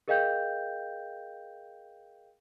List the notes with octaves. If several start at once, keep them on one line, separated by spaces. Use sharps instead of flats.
G#4 A#4 D#5 F5 G5 G6